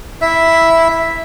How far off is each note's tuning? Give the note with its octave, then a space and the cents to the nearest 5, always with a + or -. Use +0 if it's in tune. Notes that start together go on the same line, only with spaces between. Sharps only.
E4 -10 E5 +0